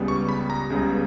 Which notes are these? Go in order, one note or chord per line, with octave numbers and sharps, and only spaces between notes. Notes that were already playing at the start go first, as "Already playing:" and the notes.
Already playing: C#2 C#3 G3 B3
C#6
B5
A#5
C#2 C#3 G3 B3